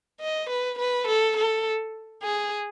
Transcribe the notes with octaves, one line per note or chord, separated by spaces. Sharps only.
D#5
B4
B4
A4
A4
G#4